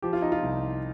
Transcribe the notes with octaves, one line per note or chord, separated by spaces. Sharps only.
F3 G4
F4
D#4
F4
C2